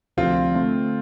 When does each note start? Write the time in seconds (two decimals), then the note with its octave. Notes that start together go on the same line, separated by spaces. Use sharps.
0.17 D2 C3 F3 C4 D4 F4
0.54 D3 A3 C4 F4